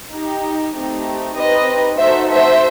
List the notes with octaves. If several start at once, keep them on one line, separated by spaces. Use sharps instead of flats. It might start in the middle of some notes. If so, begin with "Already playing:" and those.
D#4 G4
A3 C4 D#4 G4
C4 D#4 G4 B4 D#5
A3 D#4 F#4 A4 C5 E5
C5 E5